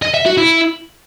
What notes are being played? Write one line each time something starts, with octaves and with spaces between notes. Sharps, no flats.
D#5
E5
F#4
E4